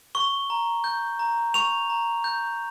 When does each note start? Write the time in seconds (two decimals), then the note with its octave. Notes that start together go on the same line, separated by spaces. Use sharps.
0.15 C#6 G7
0.50 A#5
0.84 G6
1.19 A#5
1.54 C#6 F7
1.90 A#5
2.24 G6